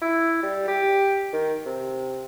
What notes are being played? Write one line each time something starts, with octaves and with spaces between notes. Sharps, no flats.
E4
G3
G4
D#3
C3